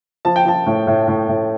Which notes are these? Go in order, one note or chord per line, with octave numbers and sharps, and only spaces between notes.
F3 A5
G5
F3 A5
A2
A2
A2
A2